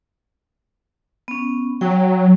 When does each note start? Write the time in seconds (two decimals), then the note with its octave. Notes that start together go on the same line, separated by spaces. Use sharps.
1.28 B3 C#4
1.81 F#3 G5